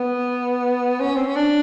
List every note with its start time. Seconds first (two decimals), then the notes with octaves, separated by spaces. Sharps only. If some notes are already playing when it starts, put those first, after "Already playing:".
Already playing: B3
1.00 C#4
1.16 C4
1.27 C#4
1.36 D4